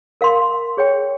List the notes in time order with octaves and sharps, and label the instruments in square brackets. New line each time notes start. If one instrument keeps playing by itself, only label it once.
[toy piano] A#4 F5 C6
G#4 C#5 G5